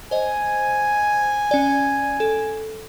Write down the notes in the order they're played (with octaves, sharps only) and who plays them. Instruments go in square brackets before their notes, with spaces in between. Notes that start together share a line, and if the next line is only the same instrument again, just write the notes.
[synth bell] C5 D#5 [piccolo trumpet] G#5
[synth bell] C#4 D5
A4